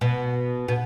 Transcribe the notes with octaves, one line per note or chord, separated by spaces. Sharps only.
B2
B2